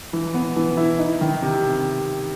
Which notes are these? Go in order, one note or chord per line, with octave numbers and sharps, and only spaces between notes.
E3
B3
E3
E4
D#4
D#3
C3